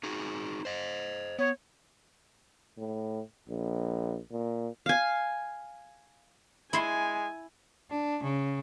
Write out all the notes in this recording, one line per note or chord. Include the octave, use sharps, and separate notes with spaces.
D#4 F#4 G#4
C5 D#5
B3 C#5
A2
A#1
A#2
F5 G#5
G#3 E4 G#5 C6
D4
C#3